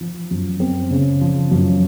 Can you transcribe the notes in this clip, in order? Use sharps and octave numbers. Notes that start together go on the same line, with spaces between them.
F3
F#2
C4
C#3
F3
F#2